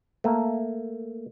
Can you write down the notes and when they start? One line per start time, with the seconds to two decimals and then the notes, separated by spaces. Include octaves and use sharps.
0.24 A3 A#3